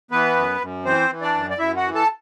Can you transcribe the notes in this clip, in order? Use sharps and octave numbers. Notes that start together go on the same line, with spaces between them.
E3 B3 B4
F#2
F#2
E3 C4 C5
E3
D4 D5
F#2
D5
F#2 E4 E5
F#4 F#5
E3
A4 A5